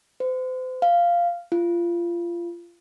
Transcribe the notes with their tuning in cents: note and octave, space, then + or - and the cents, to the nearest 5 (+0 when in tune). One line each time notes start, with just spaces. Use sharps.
C5 -35
F5 -5
F4 -25